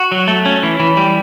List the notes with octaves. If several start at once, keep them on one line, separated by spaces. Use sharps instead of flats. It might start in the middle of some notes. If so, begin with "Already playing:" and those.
Already playing: F#4
F#3
A3
C#4
E3
E3
G3